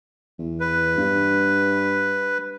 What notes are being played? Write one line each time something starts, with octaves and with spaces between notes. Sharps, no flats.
E2
B4
G2